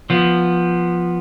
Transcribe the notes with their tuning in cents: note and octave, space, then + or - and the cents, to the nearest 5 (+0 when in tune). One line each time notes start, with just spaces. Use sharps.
F3 +0 B3 -5